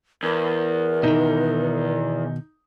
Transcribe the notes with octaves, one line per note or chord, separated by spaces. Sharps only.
E2 A#4
B2 D#3 D#4